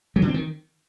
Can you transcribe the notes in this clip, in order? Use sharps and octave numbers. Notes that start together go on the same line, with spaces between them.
F#3
D3
C4
D#3